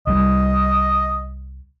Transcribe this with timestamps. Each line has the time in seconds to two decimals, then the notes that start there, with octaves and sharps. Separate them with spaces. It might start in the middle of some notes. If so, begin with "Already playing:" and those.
0.07 C2 G3 D#5